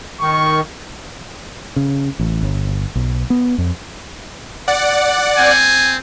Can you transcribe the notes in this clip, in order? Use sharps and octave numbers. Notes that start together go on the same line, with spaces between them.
D#3 C#6
C#3
A1
G1
B1
B3
F2
D5 F#5
C4 G#5